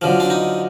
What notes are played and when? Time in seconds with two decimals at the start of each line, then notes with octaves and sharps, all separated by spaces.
0.02 F#2 D3 F3
0.20 D4
0.30 D#4